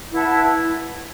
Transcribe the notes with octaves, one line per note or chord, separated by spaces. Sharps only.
E4 B4 F#5 A5